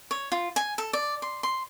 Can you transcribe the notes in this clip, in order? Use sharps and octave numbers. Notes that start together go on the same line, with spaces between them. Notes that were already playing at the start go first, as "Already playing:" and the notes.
C#5
F4
G#5
A4
D5
C6
C6